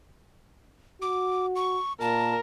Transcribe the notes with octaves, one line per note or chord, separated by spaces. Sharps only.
F#4 D6
C#6
A#2 A#4 A5